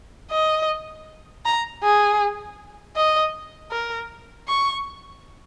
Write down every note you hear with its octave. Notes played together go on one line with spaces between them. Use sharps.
D#5
A#5
G#4
D#5
A#4
C#6